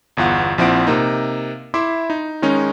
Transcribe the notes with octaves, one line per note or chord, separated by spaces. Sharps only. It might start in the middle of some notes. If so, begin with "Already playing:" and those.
G1 E2 F4 F#5
A#1 F3 C4 E4 F#5 D7
C3 A#3 D#4
E4 E5 C6 D6
D#4
D#3 G#3 C#4 D#4